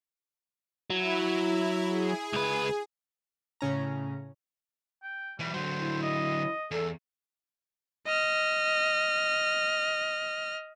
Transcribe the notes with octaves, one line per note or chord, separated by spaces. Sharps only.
F#3 E4
G#4
C#2 B4
A2 C#3 C#4 A#5
G5
B1 E3 G3
D3 F#3 C5
E4
D#5
E2 A4
D#5 F6